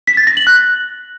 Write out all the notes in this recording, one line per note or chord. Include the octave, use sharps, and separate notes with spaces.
B6
A6
A#6
F#7
F#6